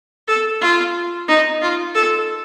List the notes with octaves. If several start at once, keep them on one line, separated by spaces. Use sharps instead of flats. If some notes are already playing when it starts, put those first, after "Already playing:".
A4
F4
D#4
F4
A4